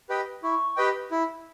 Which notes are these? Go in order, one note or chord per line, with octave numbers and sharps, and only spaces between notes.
G4 B4 D#5 G5
E4 C#6
G4 B4 D#5 G5
E4